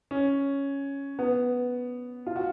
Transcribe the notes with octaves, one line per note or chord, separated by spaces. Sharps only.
C#4
B3
F4
F#4